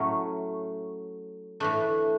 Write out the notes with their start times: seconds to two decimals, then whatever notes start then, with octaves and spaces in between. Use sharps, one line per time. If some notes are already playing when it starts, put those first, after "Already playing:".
Already playing: A2 F#3 A3 C#4
1.60 A2 E3 A3 D4